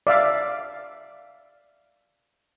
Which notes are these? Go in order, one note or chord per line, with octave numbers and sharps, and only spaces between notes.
D5 E5 F5